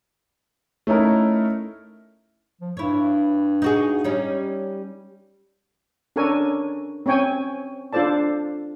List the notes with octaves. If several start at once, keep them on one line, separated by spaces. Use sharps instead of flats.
A3 C#4 D#4 E4 A#4
F3
G2 E4 C#5
D#4 F#4 G#4
G3 C#4 D#4
C#4 D4 A4 A#4 C#5 G#5
C4 C#4 C#5 G5 G#5
D4 F4 A4 C5 D5 A5